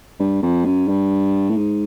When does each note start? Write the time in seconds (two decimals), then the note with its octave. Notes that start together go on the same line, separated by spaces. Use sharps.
0.20 G2
0.43 F2
0.65 F#2
0.88 G2
1.49 A2
1.57 G#2